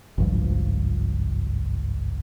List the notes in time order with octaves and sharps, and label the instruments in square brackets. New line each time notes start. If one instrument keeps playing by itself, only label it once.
[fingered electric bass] G#1 C#2 G2 F3